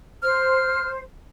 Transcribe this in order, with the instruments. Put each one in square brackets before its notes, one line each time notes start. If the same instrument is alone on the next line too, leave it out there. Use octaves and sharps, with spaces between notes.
[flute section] C5 [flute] F6